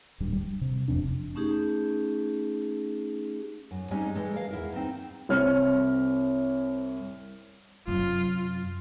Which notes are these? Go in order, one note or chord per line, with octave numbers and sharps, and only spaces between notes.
D1 G2 G3
G3
C3
F#1 F2 C3 D4
A3 C#4 D#4 G4 G#4
F#2
G3 G#3 C4 C#4 D#4
E3 G#3 A4
A#4 F5
E2 E4 A#4
C4 D#4
C2 C4 C#5 F6
F#2 C3 F4